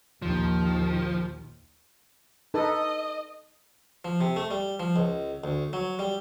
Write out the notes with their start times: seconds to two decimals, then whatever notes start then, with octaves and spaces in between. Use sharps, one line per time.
0.22 A#1 D#2 D#3 F3
2.54 D#4 A4 B4 D#5
4.05 F3
4.21 C3
4.36 A3
4.51 G3
4.80 F3
4.96 C#2
5.44 D2
5.73 F#3
5.99 G3